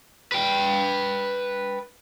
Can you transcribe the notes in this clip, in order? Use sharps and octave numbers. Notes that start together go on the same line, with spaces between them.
B4 G5